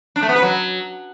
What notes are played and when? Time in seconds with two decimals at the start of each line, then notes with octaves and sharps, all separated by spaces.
0.16 D4
0.22 A3
0.29 B3
0.36 B4
0.42 F#3